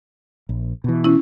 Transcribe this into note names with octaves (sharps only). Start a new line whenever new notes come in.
A#1
B2 E3
C#4 E4